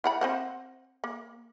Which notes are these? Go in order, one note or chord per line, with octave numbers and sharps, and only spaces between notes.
E4 F#5 B5
C4 C5 F#5
A#3